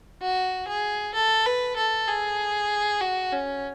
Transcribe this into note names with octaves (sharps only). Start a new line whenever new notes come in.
F#4
G#4
A4
B4
A4
G#4
F#4
C#4